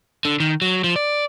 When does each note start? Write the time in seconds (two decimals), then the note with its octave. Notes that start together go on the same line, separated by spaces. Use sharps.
0.25 D3
0.40 D#3
0.62 F#3
0.84 F3
0.96 D5